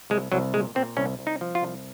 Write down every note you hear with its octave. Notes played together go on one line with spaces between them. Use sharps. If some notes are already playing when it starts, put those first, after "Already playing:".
C2 G#3
C2 F#3
A#2 G#3
A#2 C4
C2 C#4
C2
D#4
F3
F4
C2